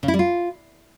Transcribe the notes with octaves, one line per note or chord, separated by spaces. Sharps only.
C#3
E4
G3
F4